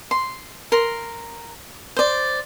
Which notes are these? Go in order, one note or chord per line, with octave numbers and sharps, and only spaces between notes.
C6
A#4 C6
C5 D5